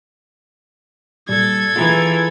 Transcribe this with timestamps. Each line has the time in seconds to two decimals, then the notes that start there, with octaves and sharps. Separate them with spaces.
1.29 A#2 G3 A4 G#6
1.76 E3 F4 G#4 A#5